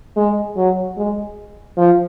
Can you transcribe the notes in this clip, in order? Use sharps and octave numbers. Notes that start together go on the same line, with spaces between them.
G#3
F#3
G#3
F3